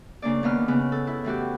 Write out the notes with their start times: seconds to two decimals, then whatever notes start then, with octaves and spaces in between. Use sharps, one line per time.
0.22 C#3 A#3 D4 D5
0.43 D#2 A#3 B3 F6
0.68 C#3 B3
0.92 A4
1.07 E4
1.25 A2 E3 F#4 G4